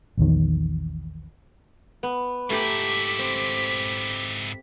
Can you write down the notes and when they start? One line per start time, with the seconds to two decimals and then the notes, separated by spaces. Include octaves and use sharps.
0.18 A#1 E2 D#3
2.03 B3
2.50 G#2 A3 E4 G4 A#5 D6 B6
3.19 C4